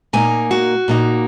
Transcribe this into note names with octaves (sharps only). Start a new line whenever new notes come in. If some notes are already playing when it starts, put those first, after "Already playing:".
A#2 A#3 D#4 G#5
F#4
A#2 A#3 D#4